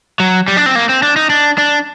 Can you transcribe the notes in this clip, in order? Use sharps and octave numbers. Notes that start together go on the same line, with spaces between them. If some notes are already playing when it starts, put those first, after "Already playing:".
F#3
G3
D4
C4
A#3
C4
D4
D#4
D4
D4